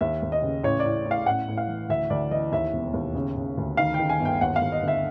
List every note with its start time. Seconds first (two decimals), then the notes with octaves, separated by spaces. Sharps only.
0.01 D#2 E5
0.22 D#2
0.32 D#5
0.43 C#3
0.63 A1 C#5
0.80 D5
0.85 A2
1.05 A2
1.11 F5
1.26 A1 F#5
1.48 A2
1.57 F5
1.68 E3
1.89 D2 E5
2.10 D2 D5
2.31 E3 D#5
2.52 D#2 E5
2.73 E1
2.94 D#2
3.14 C#3
3.37 C#3
3.57 D2
3.77 D#3 F5
3.94 D#3 G5
4.09 G#5
4.20 G1
4.25 G5
4.41 D#2 F#5
4.56 F5
4.61 D#2
4.72 D#5
4.83 D3 E5